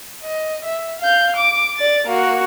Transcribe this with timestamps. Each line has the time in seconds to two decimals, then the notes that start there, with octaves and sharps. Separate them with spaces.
0.23 D#5
0.64 E5
0.99 F5 G6
1.36 D6
1.77 D5 A6
2.07 A#3 F#4